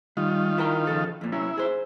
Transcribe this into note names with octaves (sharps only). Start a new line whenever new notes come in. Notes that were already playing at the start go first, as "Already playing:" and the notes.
D#3 G3 F4
E4 A#4 G5
C#3 F3 A4
F2 A#2
C3 F#3 C#4 E4
G#4 C5